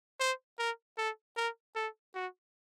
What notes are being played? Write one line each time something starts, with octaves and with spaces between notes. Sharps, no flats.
C5
A#4
A4
A#4
A4
F#4